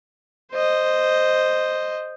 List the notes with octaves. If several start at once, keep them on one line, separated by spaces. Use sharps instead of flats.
C5 D#5